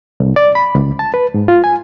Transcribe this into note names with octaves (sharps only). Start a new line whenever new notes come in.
C2
D5
B5
C#2
A5
B4
G#2
F4
G#5